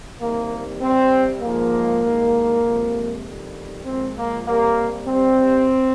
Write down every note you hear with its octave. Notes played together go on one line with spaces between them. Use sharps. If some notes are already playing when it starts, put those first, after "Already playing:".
C3 D#3 G3 A#3
C3 G3 C4
G#2 F3 G#3 A#3
G2 D#3 G#3
F2 C3 F3 G#3
F2 D#3 G3
A#2 F3 G#3 C4
A#3
C3 G3 A#3
C3 G3 C4